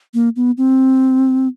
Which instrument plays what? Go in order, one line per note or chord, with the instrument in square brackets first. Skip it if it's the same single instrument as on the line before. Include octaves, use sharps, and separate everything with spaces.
[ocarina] A#3
B3
C4